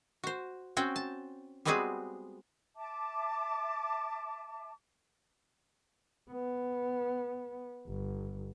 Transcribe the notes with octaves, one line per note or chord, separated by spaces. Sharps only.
F#4 C5
C4 C#4 F#4 G5
A5
G3 G#3 B3 C4 F#4 G#4
E5 A5 D6
B3
G1